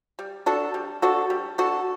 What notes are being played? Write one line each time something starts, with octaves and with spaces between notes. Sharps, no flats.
G3
D4 F#4 A4
G3
D4 F#4 A4
G3
D4 F#4 A4